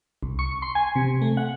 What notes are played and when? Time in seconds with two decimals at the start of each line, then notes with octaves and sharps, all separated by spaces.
0.23 C2
0.39 C#6
0.62 C6
0.75 G#5
0.95 C3
1.22 A3
1.37 F#5